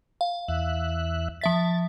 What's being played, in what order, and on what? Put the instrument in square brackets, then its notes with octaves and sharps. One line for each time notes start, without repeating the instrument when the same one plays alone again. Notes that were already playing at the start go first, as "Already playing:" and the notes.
[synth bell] F5
[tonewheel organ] E2 E5 F#6
[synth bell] F3 E5 B6 [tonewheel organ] A6